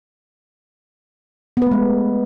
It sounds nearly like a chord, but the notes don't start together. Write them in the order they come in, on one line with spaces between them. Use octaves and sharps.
B3 B4 A3 G#3